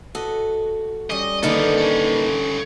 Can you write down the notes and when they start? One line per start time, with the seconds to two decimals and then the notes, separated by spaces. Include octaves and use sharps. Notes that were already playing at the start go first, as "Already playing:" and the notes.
0.15 F#4 A4 B4 D#5
1.10 G3 C#4 D#5
1.43 D3 D#3 A#3 B3 D#4 A4 B4
1.78 C#4 A4